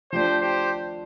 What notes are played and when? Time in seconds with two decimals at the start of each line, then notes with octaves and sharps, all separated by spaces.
0.12 F3 A3 D4 G4 C5
0.40 G4 C5